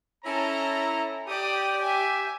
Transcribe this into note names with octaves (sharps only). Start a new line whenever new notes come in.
C#4 E4 A4 A#5
G4 D5 D#6
E5 G#5